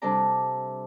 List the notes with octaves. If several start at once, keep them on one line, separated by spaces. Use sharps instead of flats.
C3 G3 D4 A4 D5 A#5